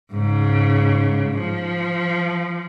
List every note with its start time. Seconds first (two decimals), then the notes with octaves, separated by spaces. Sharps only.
0.13 G#2 C#3
1.39 F3